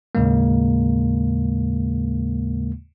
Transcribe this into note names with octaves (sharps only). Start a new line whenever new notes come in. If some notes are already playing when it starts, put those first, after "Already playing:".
D#2 A2 C#3 G#3 A#3